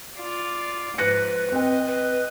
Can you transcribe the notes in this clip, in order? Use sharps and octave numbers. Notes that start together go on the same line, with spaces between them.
F4 D5
G#2 F3 B4 F#6 A#6 C#7
C4 D#5 G5
B4